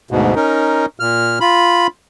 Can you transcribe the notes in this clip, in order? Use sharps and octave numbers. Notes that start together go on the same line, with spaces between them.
D2 G#2 B2
C#4 D#4 A#4
A#2 F6
F4 B5